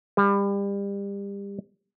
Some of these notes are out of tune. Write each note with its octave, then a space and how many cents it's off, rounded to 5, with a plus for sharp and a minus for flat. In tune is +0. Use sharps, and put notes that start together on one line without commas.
G3 +30